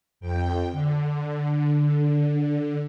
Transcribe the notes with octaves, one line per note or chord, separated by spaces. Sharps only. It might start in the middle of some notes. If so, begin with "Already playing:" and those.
F2 G5
D3